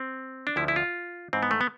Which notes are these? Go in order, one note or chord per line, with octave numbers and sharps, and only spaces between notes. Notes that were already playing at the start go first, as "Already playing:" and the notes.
Already playing: C4
D4
D2 D3 F3 E4
E4
F4
G#2 E3 C4
B3
A3
B3